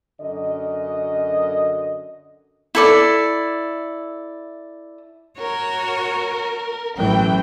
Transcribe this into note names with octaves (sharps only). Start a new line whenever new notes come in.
F#2 D3 D#5
E4 A4 D5
F#4 A#4 C#5
A1 E3 F#3 A3 G5